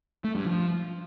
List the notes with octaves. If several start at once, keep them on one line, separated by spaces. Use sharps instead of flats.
A3
G2
F3